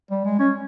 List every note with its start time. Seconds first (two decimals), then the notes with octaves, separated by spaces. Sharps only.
0.11 G3
0.25 G#3
0.39 C#4